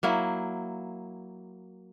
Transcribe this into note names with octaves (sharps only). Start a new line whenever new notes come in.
F#3 A#3 E4